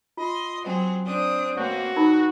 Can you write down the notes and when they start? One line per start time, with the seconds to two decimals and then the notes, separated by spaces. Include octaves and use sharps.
0.17 F4 D#5 C6
0.63 F#3 C4 G#4
1.05 C4 D4 D#6
1.57 B2 A#3 C4 F#4 C#5
1.96 D#3 D#4 A#4 B5